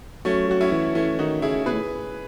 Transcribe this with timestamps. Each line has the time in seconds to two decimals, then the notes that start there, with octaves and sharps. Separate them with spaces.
0.25 F#3 A3 C#4
0.49 F#3 F#4
0.61 C#4 E4
0.72 E3
0.95 E3 A3 C#4
1.19 D#3 D#4 F#4
1.42 C#3 E4 G#4
1.66 B2 G#4 B4
1.73 A2